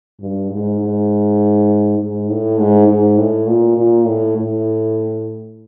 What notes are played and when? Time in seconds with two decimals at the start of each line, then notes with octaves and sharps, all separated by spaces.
0.20 G2
0.51 G#2
0.80 G#2
1.99 G#2
2.29 A2
2.58 G#2
2.88 G#2
3.18 A2
3.47 A#2
3.78 A#2
4.07 A2
4.37 A2